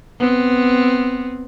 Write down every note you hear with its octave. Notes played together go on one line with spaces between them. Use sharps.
B3 C4